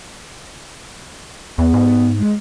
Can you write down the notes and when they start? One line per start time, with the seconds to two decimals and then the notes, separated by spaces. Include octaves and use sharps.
1.58 E2 B3
1.74 G#2
2.19 G#3